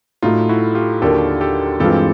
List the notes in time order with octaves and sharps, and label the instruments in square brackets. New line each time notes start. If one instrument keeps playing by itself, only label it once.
[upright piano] A2 F#3 A3 [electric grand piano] D#4 F4
[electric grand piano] E4 F#4
F4 G4
[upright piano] D#2 D3 F#3 A#3 [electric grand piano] G4 A4
[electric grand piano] G4 A4
[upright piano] G2 E3 G#3 C4 F4 [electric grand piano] G4 A4